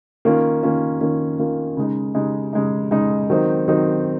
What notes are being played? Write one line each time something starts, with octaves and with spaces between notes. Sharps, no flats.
D#3 A#3 C#4 F4
D#3 A#3 C#4 F4
D#3 A#3 C#4 F4
D#3 A#3 C#4 F4
C#3 G#3 D#4
C#3 G#3 D#4
C#3 G#3 D#4
C#3 G#3 D#4
D#3 F#3 C4 D#4
D#3 F#3 C4 D#4